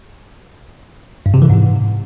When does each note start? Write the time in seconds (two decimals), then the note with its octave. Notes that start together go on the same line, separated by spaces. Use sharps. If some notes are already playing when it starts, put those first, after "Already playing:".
1.26 G2
1.34 C3
1.42 E3
1.50 G#2